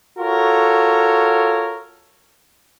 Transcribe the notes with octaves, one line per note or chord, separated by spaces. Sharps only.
F4 F#4 A4 A#4 C#5